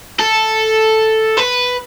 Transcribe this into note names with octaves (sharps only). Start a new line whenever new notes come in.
A4
B4